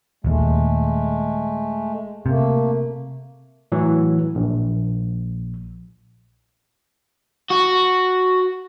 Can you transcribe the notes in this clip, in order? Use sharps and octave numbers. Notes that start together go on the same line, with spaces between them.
D#1 D#2 G#3 A3
C3 A3 A#3
A2 E3 F#3
A#1
F#4